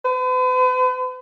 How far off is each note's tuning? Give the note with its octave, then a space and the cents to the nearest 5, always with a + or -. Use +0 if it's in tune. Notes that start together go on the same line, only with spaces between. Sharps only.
B4 +45